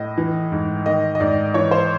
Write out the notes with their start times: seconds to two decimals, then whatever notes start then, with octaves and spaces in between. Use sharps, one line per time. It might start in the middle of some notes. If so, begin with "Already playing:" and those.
Already playing: A2 D#5
0.18 E3
0.52 G#2
0.86 D#3 D#5
1.15 D#5
1.20 G#2 D5
1.54 E3 C#5
1.71 C5